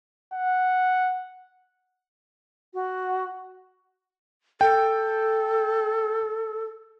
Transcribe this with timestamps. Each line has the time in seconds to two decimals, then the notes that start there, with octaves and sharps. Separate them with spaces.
0.34 F#5
2.74 F#4
4.61 A4 G5